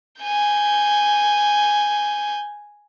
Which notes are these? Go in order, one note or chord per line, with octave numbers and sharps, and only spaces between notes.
G#5 G6